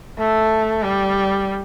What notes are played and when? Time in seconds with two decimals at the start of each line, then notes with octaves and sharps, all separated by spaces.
0.19 A3
0.83 G3